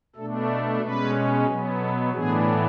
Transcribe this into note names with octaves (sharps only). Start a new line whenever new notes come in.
B2 A3 D4 A4
A4
B2 G#3 C#4 B4
B2 F#3 B3
A4
A2 E3 B3 D4 G#4